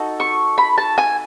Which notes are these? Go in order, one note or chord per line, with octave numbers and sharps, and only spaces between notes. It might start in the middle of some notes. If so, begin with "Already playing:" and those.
Already playing: D#4 F#4 A4
C#6
B5
A5
G#5